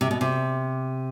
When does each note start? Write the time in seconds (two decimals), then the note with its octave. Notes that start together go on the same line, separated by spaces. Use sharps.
0.01 C3
0.11 B2
0.21 C3